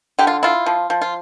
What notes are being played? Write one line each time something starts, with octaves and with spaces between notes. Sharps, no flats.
D3 G4
F4
E4 F4
F3
F3
F4